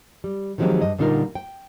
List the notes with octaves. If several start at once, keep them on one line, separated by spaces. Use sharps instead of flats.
G3
D#3 F3 F#3 G#3 C4 G4
G2 D#5
A#2 D3 G3 D#4 F4 A#4
G5